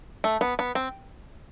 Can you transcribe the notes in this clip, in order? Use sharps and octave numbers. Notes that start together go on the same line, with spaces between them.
A3
B3
B3
C4